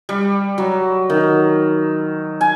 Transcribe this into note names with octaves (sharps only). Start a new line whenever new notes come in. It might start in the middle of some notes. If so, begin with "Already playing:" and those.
G3
F#3
D#3
G#5